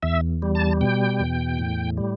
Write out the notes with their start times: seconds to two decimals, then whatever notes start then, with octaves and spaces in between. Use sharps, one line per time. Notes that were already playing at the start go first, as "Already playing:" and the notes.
0.03 E2 E5
0.42 G3
0.55 A5
0.81 B2 G5
1.20 E2
1.59 A2
1.97 G3